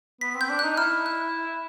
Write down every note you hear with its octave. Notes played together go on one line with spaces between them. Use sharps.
B3 B6
C4
G6
D4
D#4 F#6
E4 F6
F#6